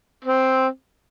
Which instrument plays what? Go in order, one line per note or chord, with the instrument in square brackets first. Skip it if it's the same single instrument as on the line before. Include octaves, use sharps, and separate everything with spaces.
[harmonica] C4